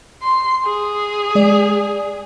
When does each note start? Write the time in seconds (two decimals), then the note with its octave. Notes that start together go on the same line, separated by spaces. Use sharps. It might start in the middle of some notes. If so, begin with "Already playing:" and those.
0.23 C6
0.64 G#4
1.35 G#3 D5